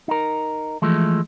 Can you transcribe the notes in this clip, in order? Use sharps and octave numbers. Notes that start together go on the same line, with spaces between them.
D#4 A#4
E3 F3 G#3 A3